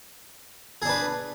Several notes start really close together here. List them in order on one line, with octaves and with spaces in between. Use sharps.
G#4 D4 B4